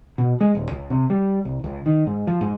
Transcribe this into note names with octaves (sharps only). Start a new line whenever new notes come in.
B2
G#3
D#1
C#2
C3
G3
C2
C#2
D#3
G#2
F3
G#2